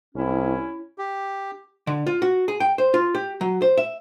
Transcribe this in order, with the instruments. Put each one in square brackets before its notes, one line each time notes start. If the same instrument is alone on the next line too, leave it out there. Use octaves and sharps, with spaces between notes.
[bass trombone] C2 [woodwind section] C#4 E4
[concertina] G4
[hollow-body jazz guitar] D3
F4
F#4
G#4
G5
C5
F4
G4
F#3
C5
E5